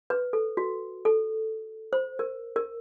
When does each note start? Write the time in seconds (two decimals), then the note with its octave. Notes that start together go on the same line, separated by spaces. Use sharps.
0.10 B4
0.33 A4
0.57 F#4
1.05 A4
1.93 C5
2.19 A#4
2.56 A#4